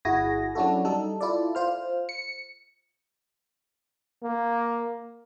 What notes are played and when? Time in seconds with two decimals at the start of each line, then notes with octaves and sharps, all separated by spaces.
0.05 G1 E4 F#4 G#4 G#5 A#6
0.55 F#3 C#4 D4 E4 F#4 A4
0.85 G3 D#4 A4
1.21 E4 F4 A4 D5
1.55 F4 C5 F6
2.09 C#7
4.23 A#3